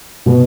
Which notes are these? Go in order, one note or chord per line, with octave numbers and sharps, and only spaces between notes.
B2